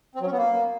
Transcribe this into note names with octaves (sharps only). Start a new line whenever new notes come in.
C4
F#3
C#4
B3
A#3